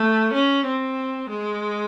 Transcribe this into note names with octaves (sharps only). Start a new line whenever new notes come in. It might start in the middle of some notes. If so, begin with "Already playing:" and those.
Already playing: A3
C#4
C4
G#3